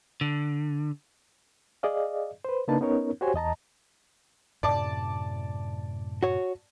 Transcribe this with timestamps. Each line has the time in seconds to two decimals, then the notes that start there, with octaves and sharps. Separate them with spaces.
0.21 D3
1.83 G#4 D5 D#5 F5
2.45 B4 C5
2.68 C#3 A#3 D4 D#4 B4 A5
2.81 B3 C#4 D#4 A#4 C#5
3.21 F#4 G4 C5 C#5 G#5
3.34 E2 D#5 A5 A#5
4.63 F#2 A2 C3 D5 A5 D6
6.23 F#4 C#5